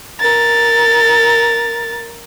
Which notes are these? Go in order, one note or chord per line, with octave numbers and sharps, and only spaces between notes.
A#4 A6